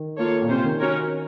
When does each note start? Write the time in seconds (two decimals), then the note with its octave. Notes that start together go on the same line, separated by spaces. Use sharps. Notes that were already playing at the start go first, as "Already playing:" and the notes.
Already playing: D#3
0.18 A#3 F4 A4 C#5
0.42 A#2
0.48 C3 C#4 F4 C5
0.64 D#3
0.79 C#4 F#4 A#4 C#5